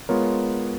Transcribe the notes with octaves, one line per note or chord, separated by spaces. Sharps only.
G#3 B3 F4 A#4 C#5